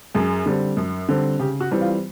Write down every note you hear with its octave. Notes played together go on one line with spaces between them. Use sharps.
F#2 G#4
D3 G3 C4
F#2
D3 G3 C4
C#3 G4
F#4
E3 G3 C4
F4